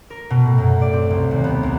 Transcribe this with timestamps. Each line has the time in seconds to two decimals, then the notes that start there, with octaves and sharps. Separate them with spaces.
0.10 A#4
0.30 B2
0.45 A2
0.58 F#2
0.82 D5
0.93 C4
1.11 C2
1.31 D#2
1.44 B3
1.63 C2